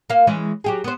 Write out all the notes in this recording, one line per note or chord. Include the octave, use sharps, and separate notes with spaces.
A#3 F5
E3 G#3 C#4
F#3 G4 G#4
B3 C5